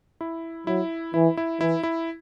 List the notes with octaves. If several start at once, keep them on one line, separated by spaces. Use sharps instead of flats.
E4
F#3 E4
E3 E4
E4
E3 E4
E4